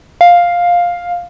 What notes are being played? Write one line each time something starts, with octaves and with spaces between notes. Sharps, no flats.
F5